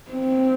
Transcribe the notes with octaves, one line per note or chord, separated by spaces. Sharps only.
C4